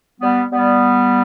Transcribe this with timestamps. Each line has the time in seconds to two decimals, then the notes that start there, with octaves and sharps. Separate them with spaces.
0.20 G3 B3
0.51 G3 B3